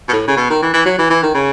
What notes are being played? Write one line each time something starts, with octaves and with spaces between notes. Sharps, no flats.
B2
A2
C#3
B2
D#3
E3
E3
F#3
E3
E3
D#3
C#3